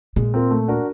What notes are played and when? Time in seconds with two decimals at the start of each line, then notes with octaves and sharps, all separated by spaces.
0.16 A#2 G#3
0.34 C4 F4 A#4
0.51 A3
0.68 D4 F#4 A#4